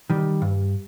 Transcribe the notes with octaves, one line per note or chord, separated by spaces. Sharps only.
D#3 G3
G2